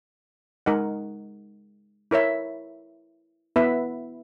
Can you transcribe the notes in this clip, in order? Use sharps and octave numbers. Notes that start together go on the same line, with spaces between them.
G#3 D#4 A#4 D#5 F#5
E4 A#4 C#5 E5
B3 E4 B4 E5